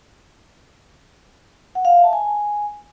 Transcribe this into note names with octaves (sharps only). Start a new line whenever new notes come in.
F#5
F5
E5
A5
G#5